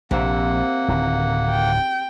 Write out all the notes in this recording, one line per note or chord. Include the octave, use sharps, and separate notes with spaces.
A#1 C3 A#3 F#5
D1 D#3
G5